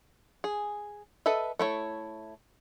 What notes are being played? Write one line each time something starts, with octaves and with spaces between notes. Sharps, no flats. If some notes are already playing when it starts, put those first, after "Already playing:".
G#4
A4 B4 D#5 E5
A3 E4 C#5